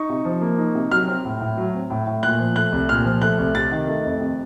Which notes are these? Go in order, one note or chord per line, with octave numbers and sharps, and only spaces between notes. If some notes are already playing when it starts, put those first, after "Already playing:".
Already playing: D#4 C#6
C3
F3
A#3
D#4
C3
F#3 F6
C4
A2
A2
F#3
C4
A2
A2
A#2 F#6
F3
A3 F#6
C2
A#2 F6
F3
A3 F#6
C2
C3 A6
D#3
A3
F2
C3